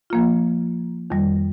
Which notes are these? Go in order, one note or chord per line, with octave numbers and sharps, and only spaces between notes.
F3 A#3 F4
F2 D#3 G3